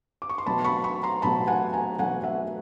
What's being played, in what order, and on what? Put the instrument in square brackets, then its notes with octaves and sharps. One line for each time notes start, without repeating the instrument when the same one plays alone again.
[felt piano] D6
C#6
C6
B2 F#3 A3 A5 B5
B5 C#6
B5 C#6
A#5 C6
B2 F#3 A3 A5 B5
F#5 G#5
G#5 A#5
B2 F#3 A3 F#5 G#5
E5 F#5